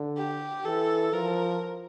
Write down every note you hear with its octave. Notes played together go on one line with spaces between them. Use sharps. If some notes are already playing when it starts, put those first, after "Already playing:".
Already playing: D3
G4
E3 A4
F3 A#4